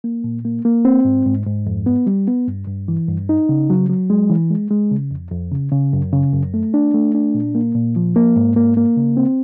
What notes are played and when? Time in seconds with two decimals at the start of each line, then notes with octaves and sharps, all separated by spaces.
0.04 A#3
0.24 A#2
0.45 A#3
0.65 A#3
0.85 C4
1.05 G#2
1.26 G#2
1.46 G#2
1.67 F2
1.86 B3
2.07 G3
2.27 B3
2.48 G2
2.67 G2
2.88 E3
3.08 G2
3.29 D#4
3.49 C#3
3.70 F#3
3.89 F#3
4.10 G#3
4.30 E3
4.50 G#3
4.71 G#3
4.91 C#3
5.11 F2
5.31 F2
5.52 C#3
5.72 C#3
5.93 F#2
6.13 C#3
6.33 F#2
6.54 A3
6.74 D4
6.94 A3
7.15 D4
7.34 A#2
7.55 A#3
7.75 A#2
7.96 F3
8.16 A#3
8.36 G#2
8.56 A#3
8.77 A#3
8.97 C#3
9.17 C4